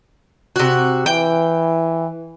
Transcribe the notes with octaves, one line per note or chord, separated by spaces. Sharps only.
C3 F#4
E3 G5